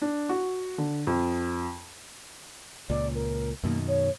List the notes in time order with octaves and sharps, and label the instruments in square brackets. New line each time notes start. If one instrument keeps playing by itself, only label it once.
[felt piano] D4
F#4
D3
F2
[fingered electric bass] C#2 A#2 [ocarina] D5
[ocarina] A#4
[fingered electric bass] F#2 B2 D#3 [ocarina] A#3
[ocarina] C#5